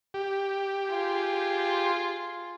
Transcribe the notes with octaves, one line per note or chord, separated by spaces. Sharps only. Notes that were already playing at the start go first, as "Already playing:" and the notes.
G4
F4 G#4